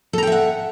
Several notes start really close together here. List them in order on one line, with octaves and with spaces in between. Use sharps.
A4 A#5 G5 E5 F#5